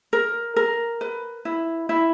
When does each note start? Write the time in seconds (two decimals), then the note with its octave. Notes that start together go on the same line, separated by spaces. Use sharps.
0.13 A#4
0.56 A#4
1.01 B4
1.45 E4
1.89 E4